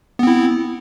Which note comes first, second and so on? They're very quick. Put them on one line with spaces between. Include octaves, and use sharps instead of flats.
B3 C4 E4